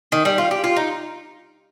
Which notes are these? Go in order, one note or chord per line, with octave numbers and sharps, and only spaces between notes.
D#3
G3
F4
G4
F4
D#4